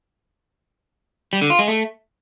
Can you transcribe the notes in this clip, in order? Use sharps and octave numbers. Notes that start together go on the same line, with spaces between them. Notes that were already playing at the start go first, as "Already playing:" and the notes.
G3
D3
F4
G#3
A3